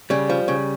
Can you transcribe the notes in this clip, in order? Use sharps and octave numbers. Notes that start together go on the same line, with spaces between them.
C#3 G3
F3
C#3